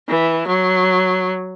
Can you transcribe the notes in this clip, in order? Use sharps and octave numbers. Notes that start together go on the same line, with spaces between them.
E3
F#3